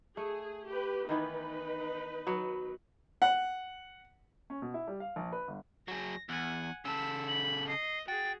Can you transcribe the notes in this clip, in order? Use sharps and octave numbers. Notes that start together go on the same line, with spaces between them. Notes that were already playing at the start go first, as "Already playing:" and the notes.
A3 G#4
G4 B4
D#3 E3 B3 D#4 B4
F#3 B3
F#5
C#4
B2
E4
G3
F5
A#1
B4
G1
F#3 G#4 A#6
E2 F#5 G#5
C#3 A4 B5 E6
B5 F#7
D#5 C7
F#4 G#4 G5 A6